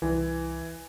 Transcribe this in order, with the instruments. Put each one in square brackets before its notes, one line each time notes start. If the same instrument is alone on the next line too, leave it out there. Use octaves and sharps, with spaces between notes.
[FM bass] C2 [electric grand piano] E3